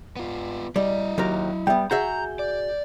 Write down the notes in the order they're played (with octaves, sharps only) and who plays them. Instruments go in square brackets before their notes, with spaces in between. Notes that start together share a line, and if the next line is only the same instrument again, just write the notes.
[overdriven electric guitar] B3 F4
[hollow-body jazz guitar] G3 [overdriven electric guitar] E4 D#5
[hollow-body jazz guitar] D#2 G4 A#4 [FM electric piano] F#3
[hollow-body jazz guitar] G3 B3 [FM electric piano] E5 G5
[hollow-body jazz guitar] F#4 G#4 E5 [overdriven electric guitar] A#5 [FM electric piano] G6
[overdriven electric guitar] D5